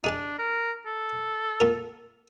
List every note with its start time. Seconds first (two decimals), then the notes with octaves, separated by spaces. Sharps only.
0.04 D4 D#4 G#4 A5
0.39 A#4
0.86 A4
1.60 A#2 A#4